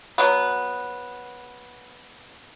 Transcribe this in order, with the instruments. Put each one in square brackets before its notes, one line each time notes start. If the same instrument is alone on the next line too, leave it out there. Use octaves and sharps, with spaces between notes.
[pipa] B2 F#3 B3